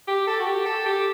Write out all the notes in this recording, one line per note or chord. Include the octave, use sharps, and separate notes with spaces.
G4
A4
F#4
G4
A4
G4